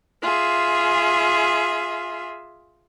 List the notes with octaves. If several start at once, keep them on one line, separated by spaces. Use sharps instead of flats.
F4 G#4 E5